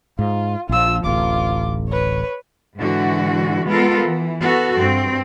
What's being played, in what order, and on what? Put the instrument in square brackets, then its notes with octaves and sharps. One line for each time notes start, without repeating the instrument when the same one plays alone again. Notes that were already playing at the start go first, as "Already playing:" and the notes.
[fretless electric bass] G#2 [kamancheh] F4
[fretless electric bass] A#1 F3 [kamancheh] F4 E6
[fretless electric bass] D1 A1 [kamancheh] F4 D6
[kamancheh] B4 C#5
[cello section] G#2 D3 E3 F#4
G#3 B3 F4 A4 A#4
E3
B3 F#4 A4
G2 C4